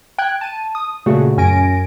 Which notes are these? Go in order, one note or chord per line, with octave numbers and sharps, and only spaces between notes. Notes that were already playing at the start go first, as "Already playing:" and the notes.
G5 F#6 G#6
A5 D#7
D#6
A#2 C#3 A3 F#4 F#5
F#2 C#4 G#5 A#6 D7